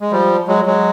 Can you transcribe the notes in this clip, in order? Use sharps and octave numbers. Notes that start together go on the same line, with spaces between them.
G#3
F3 G3
F#3 G#3
F#3 G#3